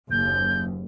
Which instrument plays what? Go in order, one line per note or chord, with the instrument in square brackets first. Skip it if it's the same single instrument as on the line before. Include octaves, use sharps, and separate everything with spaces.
[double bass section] F#1 D#2 [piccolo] G6